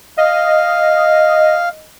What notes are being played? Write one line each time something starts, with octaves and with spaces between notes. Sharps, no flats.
D#5 F5